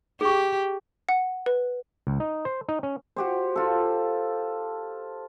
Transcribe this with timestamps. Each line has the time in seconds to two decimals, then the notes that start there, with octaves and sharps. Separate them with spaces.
0.21 G4 G#4 C#6
1.09 F#5
1.46 B4
2.07 C#2
2.20 D#4
2.45 C5
2.69 D#4
2.83 C#4
3.16 F#4 G4 C5
3.56 F4 A4